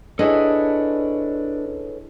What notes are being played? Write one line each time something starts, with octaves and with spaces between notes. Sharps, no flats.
D4 E4 G#4 A4 B4 C#5 D#5